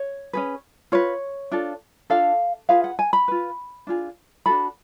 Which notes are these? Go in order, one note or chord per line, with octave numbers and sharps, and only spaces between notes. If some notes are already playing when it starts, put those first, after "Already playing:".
Already playing: C#5
C#4 G#4 B4
F4 B4 C#5
D4 F4 A4
D4 F4 A4 F5
F4 G#4 B4 F5
F#5
G#5
B5
F4 B4
D4 F4 G#4
D4 F#4 A4 B5